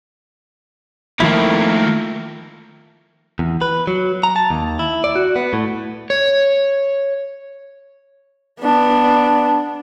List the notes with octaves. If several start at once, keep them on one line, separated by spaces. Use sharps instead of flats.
D#3 F3 A3 A#3 E4
E2
B4
F#3
A#5
A5
D#2
E4
D5
F#4
B3
A2
C#5
B3 D4